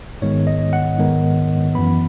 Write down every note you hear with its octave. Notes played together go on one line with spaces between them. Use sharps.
G#2 D#3 G#3 B3 C#5
D#5
F#5
G#2 D#3 G#3 B3
F#2 E3 B3 B5